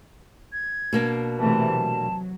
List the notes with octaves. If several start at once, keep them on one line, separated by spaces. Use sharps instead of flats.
G#6
B2 A#3 D4
C3 E3 A3 A5
F#3